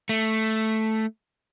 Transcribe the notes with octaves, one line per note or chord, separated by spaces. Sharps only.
A3